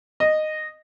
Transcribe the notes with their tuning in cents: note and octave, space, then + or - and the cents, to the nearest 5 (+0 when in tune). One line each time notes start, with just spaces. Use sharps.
D#5 -10